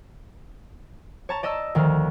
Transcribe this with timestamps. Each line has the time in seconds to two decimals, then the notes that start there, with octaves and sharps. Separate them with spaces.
1.29 C#5 A5 A#5
1.43 D5 D#5 A5 E6
1.75 D2 D#3 F3 F6